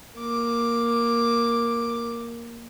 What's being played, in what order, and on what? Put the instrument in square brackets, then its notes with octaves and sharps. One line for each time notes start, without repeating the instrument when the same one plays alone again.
[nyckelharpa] A#3 D6